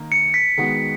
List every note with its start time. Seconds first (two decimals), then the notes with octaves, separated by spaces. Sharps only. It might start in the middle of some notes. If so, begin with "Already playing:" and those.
Already playing: D#3 A#3
0.12 C#7
0.34 B6
0.57 D#3 G#3 B3 F#4